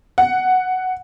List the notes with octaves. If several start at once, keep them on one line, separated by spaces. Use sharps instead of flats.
F#5